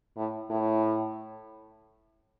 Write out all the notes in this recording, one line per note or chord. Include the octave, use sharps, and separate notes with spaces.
A2
A2